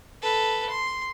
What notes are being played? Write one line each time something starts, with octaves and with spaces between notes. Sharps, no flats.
A4 B4
C6